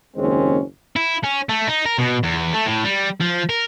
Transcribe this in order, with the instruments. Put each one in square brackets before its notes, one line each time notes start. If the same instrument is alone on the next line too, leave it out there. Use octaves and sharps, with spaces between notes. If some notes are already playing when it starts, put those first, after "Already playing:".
[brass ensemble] F#1 D#2 G#3 C4 C#4 C5
[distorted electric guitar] E4
C#4
A3
D#4
A#4
B2
E2
A3
A2
G3
F3
A#4